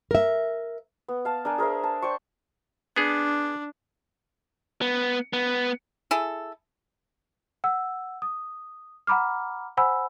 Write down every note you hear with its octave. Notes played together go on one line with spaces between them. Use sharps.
A#4 E5
B3
F5 A5
D4 A#4 G#5
G#4 A#4 C5 E5
A5
C5 D5 G5 C#6
B3 D4 G#4
B3
B3
E4 G#4 A4
F#5 E6
D#6
F#5 A#5 B5 D6 F6
C5 F#5 G#5 B5 E6